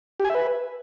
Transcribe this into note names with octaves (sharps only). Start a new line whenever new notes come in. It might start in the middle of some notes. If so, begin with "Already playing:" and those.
G4
G#5
E5
B4